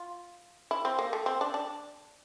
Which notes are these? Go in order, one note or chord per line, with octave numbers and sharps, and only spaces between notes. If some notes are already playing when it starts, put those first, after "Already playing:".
Already playing: F4
E4
C4
A#3
A3
C4
D4
D4